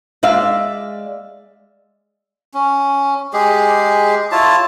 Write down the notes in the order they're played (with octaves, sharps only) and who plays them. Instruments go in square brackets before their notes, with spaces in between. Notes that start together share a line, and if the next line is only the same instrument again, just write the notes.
[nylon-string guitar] G#3 D5 E5 F5
[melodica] C#4
G#3 G4 G#4
E4 F4 C#5 A5